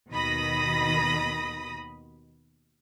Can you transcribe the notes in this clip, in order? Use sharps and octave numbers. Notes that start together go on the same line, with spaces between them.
D#2 B2 D#3 B5 D#6 A#6